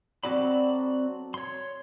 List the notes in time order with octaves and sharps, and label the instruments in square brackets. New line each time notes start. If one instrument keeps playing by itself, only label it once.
[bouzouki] F#3 A4 D5 [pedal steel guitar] C4 F#4 B5
[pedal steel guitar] C#5 C6